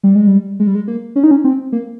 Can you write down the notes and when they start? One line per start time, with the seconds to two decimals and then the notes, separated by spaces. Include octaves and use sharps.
0.04 G3
0.15 G#3
0.27 G3
0.60 G#3
0.67 G3
0.75 G#3
0.88 A#3
1.16 C#4
1.24 D#4
1.31 C#4
1.44 C4
1.72 A#3